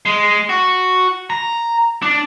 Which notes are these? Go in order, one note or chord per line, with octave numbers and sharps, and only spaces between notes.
G#3
F#4
A#5
D4